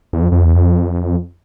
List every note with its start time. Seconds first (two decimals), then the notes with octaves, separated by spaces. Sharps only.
0.13 E2
0.22 F2
0.32 F2
0.44 E2
0.55 F2